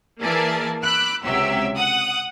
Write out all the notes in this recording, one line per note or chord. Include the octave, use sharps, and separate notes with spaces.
E3 A#3 G#4 A#4 D5 A5
B5 D6 E6 F#6
C#2 C3 F#3 G4 E5 E6
F#5 D#6 F#6